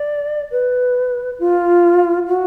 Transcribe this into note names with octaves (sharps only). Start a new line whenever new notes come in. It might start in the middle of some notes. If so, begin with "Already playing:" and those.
Already playing: D5
B4
F4
F#4